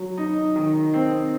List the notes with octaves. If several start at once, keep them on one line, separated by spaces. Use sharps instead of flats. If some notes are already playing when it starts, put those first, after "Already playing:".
Already playing: F#3
D#4
D#3
C4